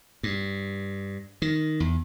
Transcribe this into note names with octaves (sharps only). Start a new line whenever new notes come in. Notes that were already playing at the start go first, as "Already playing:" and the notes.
G2
D#3
E2